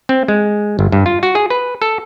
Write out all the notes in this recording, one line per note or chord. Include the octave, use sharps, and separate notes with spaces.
C4
G#3
G1
G2
F4
F#4
G#4
B4
A4